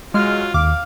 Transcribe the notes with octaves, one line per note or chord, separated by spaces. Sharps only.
F#3 G#3 F4 F6
D#2 F5 D6